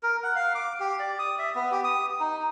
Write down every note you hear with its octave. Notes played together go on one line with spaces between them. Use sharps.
A#4
F#5
F5
D6
G4
D5
D#6
E5
B3
G4
D#6
D#4